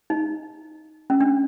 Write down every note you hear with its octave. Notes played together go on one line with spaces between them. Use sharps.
D#4
C#4
D4